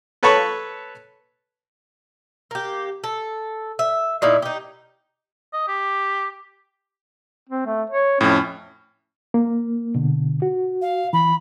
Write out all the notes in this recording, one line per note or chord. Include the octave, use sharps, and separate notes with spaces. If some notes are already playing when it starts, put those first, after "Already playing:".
A4 B4 C#5 A5 B5 C#6
A#3 G4
A4
E5
A#2 D#4 E4 F5
D#4 G4
D#5
G4
C4
A3
C#5
F2 A2 C#4
A#3
B2 D3
F#4
F5
E3 B5